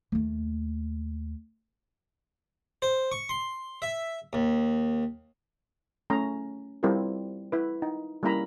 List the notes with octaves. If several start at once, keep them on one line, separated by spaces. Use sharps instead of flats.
D#2 A3
C5
C#6
C6
E5
D#2
A3 C#4 A#5
G3 C4 E4 F4 G4 A#4
E4 B4
D#4
G3 A#3 C#4 E4 A#5 B5